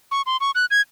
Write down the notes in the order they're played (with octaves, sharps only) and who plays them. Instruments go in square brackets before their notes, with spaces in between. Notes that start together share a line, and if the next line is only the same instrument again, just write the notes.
[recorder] C#6
C6
C#6
F#6
G#6